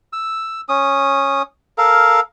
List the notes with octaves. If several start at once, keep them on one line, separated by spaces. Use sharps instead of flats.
E6
C#4 D#6
A4 A#4 F5